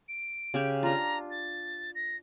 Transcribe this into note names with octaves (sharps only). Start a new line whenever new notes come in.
D7
C#3 G4 G#5
D4 F4 A#5
A6
A#6